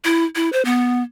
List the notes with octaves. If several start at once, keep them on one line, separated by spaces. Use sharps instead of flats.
E4
E4
C5
B3